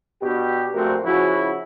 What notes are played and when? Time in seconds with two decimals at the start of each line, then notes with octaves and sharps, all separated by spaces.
0.22 B2 D4 G4
0.74 A#1 A3 C4 F#4 A#4
1.04 C#3 F3 E4 F#4